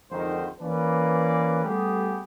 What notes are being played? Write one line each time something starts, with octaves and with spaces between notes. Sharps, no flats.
F2 G#2 D3 D#3 C5
E3 A#3 C#4 B4 D5
G3 A3 B3 G4 G#4